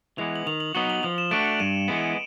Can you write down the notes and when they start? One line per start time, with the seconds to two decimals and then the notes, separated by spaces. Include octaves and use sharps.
0.18 E3 G#3 B3 F7
0.36 F#7
0.46 D#3 F7
0.60 F#7
0.75 F#3 B3 D#4 F#4 G7
0.90 F#7
1.03 F3 F7
1.18 E7
1.31 A3 D4 F#4 D7
1.39 C#7
1.46 D7
1.60 G2 D#7
1.88 E3 G#3 B3 F#7